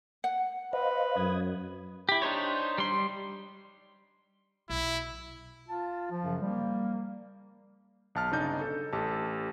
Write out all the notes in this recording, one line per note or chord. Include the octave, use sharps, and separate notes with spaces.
F#5
B4 C5 D#5 F5
F#2 D#6 G#6
E4 G4
D4 D#4 C5 C#5
G3 C6
B1 E4
F4 A5
F3
F#2 C#3 F#3
G3 A#3
B1 A5 F6
G1 C#3 D4 D#4 G6
A4
A1 G4 A4 A5